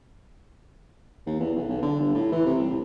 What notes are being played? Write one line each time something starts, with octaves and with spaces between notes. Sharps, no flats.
D#2
E2
B1
B1
D3
G1
A2
E3
C3
C2
A2